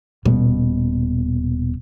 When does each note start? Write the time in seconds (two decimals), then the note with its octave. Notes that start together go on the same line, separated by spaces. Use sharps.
0.25 D#1 B2